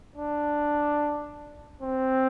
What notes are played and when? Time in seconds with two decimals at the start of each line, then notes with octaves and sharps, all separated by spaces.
0.16 D4
1.82 C4